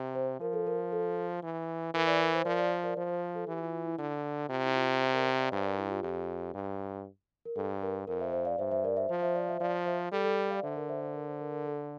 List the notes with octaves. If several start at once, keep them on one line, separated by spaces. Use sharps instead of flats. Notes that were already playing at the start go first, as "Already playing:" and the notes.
Already playing: C3
C5
F3 A#4
A4
A#4
A#4
A4
E3
E3 A#4
A#4 D5
A#4
C5
F3 A#4 D5
D5 F5
A#4 D5
F3 C5
C5
A4
E3 G4
F4
F4
E4
D3
C3 F4
E4
F4
F4
C5 E5
A#4 D5
C5 E5
D5 F5
G2 C5 E5
A#4 D5
E4
G4
F4
F2 G4
G2
A#4
G2 A4
A#4
F2 A#4
C5 E5
C5 E5
D5 F5
G2 C5 E5
C5 E5
A#4 D5
C5 E5
F3 C5
C5 E5
D5 F5
C5 E5
F3 D5 F5
C5 E5
G3 A4
A4
A4
D5 F5
D3 C5 E5
A#4
C5 E5
C5 E5
A#4
C5
A#4
A#4
A4